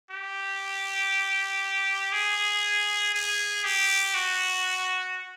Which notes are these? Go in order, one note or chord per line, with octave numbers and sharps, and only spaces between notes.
G4
G#4
G#4
G4
F#4